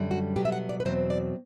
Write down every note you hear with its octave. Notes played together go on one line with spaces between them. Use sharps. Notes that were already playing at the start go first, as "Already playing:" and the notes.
Already playing: F#2 D3 G3
F#4
B2 F#3 B3 G4
E5
F#5
D5
B4
E2 B2 F#3 C4 C5
D5